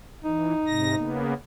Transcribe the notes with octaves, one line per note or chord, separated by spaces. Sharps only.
E3 D#4
G#2 C3 A#6
C#3 A#3 B3